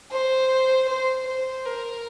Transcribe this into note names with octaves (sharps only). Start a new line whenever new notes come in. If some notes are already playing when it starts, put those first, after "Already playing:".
C5
C5
C5
A#4